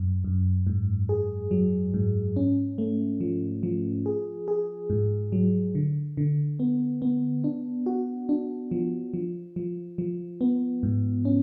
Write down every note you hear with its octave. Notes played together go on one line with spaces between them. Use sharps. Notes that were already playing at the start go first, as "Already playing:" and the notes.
Already playing: F#2
F#2
G#2
G#4
F#3
G#2
C#4
A3
F3
F3
G#4
G#4
G#2
F#3
D3
D3
B3
B3
D4
F#4
D4
F3
F3
F3
F3
B3
G#2
C#4